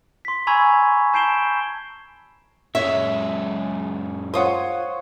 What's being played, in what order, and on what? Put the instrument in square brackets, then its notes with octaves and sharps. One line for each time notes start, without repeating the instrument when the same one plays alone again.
[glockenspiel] C6 B6
G#5 A#5 B5 C#6 E6 G#6
A5 G6 C7 D7 E7 G7
[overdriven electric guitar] F#2 G#3 [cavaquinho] C#5 [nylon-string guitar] E5
[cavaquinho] F4 D#6 [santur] C5 C#5 F#5